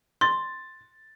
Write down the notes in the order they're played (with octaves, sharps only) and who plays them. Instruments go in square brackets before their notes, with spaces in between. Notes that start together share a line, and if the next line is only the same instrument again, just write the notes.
[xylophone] C6 [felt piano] A6